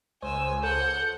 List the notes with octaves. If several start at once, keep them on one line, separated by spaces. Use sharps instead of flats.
C#2 C5 G#5 E6
A4 F#5 G6